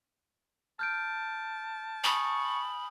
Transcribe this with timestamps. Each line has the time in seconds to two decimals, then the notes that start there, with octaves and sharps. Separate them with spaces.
0.79 A5 F6 G6 D7
2.04 G#5 B5 C#6 D#6